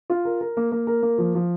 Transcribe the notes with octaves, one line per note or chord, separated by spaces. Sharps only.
F4
A#4
A#4
A#3
A#3
A#4
A#3
F3
F3